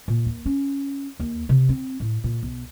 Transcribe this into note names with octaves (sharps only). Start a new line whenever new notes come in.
A#2
D#2
C#4
D#2
C3
C4
A2
A#2
B1